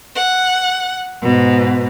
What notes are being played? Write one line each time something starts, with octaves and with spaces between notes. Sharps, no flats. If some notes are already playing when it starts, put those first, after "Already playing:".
F#5
G#2 B2